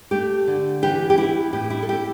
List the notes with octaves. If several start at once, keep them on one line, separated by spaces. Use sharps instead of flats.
A3 G4
D3
E3 G4
G4
B3 E4
A2 G4
E4
A4
E4 G4